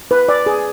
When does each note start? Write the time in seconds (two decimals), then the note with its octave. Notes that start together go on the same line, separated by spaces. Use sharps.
0.11 B4
0.29 D5
0.46 G#4